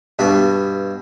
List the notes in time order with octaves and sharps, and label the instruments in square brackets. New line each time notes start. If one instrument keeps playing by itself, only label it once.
[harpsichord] G2 B2 B4